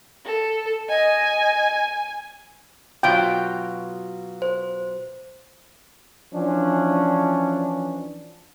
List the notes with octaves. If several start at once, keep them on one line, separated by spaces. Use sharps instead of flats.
A4
D#5 G#5
B2 F#3 F4 G5
C5
E3 F3 C#4 D4